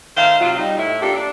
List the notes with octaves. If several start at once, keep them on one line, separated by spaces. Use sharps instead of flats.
D#3 A3 C5 F5
C3 F#3 F4
G3 D#4
A2 E4
A#3 D4 F4 G4 A4
D4